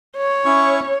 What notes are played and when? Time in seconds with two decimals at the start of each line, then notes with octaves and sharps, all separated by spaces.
0.17 C#5
0.45 C#4 E4 C#6